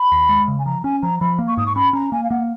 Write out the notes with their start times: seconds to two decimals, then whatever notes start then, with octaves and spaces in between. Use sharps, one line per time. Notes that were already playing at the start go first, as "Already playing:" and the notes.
Already playing: B5
0.12 D#2
0.29 G#3
0.48 C#3
0.59 G#5
0.66 F3 A#5
0.84 C#4 G#5
1.02 F3 A#5
1.20 F3 B5
1.39 A#3
1.48 C#6
1.57 G#2 D#6
1.66 C#6
1.76 C#4 B5
1.93 C#4 A#5
2.12 A#3 G#5
2.23 F5
2.30 A#3 F#5